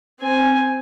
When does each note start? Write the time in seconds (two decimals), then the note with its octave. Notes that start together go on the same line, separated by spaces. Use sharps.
0.20 C4 G#5